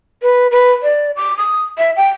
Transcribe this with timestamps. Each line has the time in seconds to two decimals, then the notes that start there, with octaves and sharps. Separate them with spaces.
0.22 B4
0.51 B4
0.83 D5
1.16 D6
1.37 D#6
1.78 E5
1.96 G5